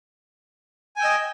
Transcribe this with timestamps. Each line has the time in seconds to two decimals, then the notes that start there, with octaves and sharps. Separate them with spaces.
0.96 G#5
0.99 G5
1.01 E6
1.04 D#5